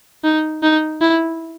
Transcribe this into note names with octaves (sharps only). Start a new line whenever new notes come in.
D#4
D#4
E4